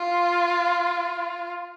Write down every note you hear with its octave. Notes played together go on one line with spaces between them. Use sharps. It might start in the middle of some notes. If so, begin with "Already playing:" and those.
Already playing: F4